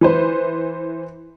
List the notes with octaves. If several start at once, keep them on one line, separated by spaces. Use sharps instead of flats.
E3 B4 C5